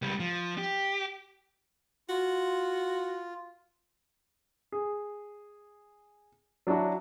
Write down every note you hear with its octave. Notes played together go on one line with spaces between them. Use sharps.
C#2 G3
F3
G4
F4 F#4
G#4
F#3 D4 E4 F#4